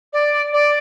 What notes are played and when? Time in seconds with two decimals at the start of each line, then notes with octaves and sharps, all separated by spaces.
0.13 D5
0.53 D5